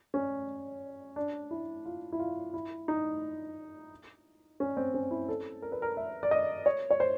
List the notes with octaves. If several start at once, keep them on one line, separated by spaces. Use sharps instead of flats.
C#4
D4
E4
F4
E4
F4
E4
D#4
C#4
C4
C#4
E4
A4
A#4
B4
A#4
E5
D5
D#5
C#5
C#5
C5